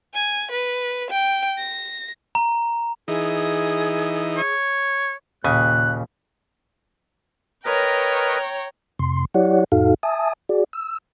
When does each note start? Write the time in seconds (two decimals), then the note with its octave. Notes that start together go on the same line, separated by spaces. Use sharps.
0.14 G#5
0.51 B4
1.10 G5
1.58 A#6
2.35 A#5
3.08 E3 D#4 G#4
4.37 C#5
5.44 D#2 A#2 C#3 G#5 F#6
7.65 A#4 B4 C#5 D#5 G5 A#5
8.99 F2 C3 C6
9.34 F#3 E4 G4 C#5 D5 F#5
9.72 F2 A2 D#4 F#4 A4 F5
10.03 E5 G#5 A5 D#6
10.49 F#4 G#4 D5
10.73 E6